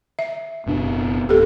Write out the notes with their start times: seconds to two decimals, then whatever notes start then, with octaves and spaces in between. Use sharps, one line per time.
0.19 E5
0.66 F#1 B2 D4
1.29 D1 G4 A4